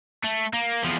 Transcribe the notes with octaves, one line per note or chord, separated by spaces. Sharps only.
A3
A#3
E2 F3